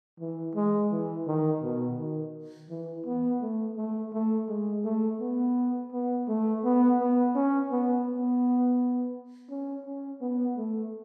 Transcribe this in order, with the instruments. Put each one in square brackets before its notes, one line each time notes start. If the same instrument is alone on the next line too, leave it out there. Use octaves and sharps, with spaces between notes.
[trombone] E3
G#3
E3
D#3
B2
D#3
E3
B3
A3
A3
A3
G#3
A3
B3
B3
A3
B3
B3
C#4
B3
B3
C#4
C#4
B3
A3